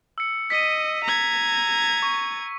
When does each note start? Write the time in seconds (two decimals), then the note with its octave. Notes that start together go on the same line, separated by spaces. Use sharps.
0.18 E6 C#7
0.50 D#5 B6 D#7
1.04 A#5 G#6
2.02 C#6